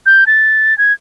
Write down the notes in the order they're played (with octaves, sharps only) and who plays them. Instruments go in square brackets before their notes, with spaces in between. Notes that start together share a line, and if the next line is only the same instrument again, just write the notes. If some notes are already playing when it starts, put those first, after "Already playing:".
[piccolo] G6
A6
G#6